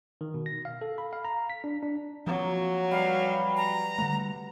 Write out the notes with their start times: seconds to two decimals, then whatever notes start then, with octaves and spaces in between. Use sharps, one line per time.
0.21 D#3
0.34 B2
0.46 A#6
0.65 F5
0.81 A4
0.98 B5
1.13 F5
1.25 A#5
1.50 B6
1.64 D4
1.83 D4
2.27 F3 F#3 A#3 C4 F#4
2.91 G3 B4 F5
3.57 A#5
3.98 D3 G3 A3 F#5